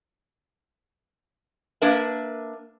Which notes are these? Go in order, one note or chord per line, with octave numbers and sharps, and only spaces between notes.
A#3 D4 A#4 B4 E5